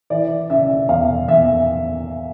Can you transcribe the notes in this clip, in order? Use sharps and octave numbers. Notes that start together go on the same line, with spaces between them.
E3 D5
C#3 E5
E2 F5
E2 E5